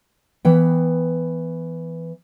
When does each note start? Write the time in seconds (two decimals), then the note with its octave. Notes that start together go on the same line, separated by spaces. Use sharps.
0.45 E3 B3 G5